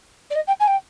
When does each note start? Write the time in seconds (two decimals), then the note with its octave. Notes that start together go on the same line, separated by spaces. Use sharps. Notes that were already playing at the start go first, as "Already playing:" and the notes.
0.30 D5
0.35 D#5
0.47 G5
0.60 G#5
0.67 G5